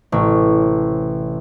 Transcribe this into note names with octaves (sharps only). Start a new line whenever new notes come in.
A1 C3 C#4